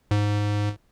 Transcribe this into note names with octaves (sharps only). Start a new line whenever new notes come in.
G#2